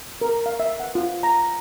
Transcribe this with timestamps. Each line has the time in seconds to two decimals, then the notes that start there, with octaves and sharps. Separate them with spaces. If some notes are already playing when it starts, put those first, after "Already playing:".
0.21 A#4
0.46 F5
0.60 E5
0.80 F#5
0.95 F4
1.23 A#5